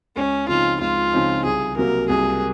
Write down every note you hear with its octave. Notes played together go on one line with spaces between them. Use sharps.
C#2 C#4
C#3 F3 C4 D#4 F4
C#2 F4
C#3 F3 C4 D#4
C2 G#4
C3 F#3 A#3 A#4
C2 G#4